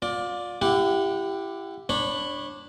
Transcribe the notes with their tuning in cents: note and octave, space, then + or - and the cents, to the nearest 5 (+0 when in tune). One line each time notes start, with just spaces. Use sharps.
F4 +30 D5 +0
E4 +30 G4 +0 F#5 -20
D4 +0 C#5 -25 B5 +5